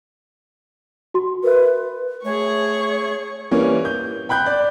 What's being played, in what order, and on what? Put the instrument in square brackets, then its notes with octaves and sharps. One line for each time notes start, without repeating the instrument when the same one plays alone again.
[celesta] F#4 C6
[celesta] A#4 E5 [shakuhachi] B4
[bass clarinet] A3 [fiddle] G#4 C#6 [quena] C#5
[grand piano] E3 G3 A#3 C#4
G6
G5 B5 F#6 G6
D5